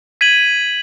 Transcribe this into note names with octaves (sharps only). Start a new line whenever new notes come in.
G#6 B6 D#7 F#7